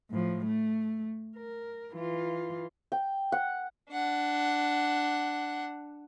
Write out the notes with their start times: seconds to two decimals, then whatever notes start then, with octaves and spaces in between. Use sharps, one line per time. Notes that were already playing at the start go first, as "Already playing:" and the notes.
0.10 A2 F3
0.45 A3
1.37 A#4
1.93 E3 F4
2.92 G5
3.32 F#5
3.90 D4 F#5